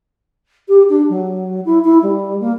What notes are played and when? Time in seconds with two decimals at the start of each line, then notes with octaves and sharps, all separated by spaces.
0.68 G4
0.89 D4
1.09 F#3
1.65 E4
1.84 E4
2.02 G3
2.40 A#3